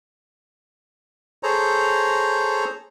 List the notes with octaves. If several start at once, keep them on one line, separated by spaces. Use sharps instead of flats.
G#4 A4 C5 C#5 A#5